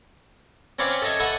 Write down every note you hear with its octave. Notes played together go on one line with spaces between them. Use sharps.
C4 C#4 B4 C#5 D5 F5
A4 C#5 D#5 E5 G#5
A4 C#5 E5 F#5 G#5 B5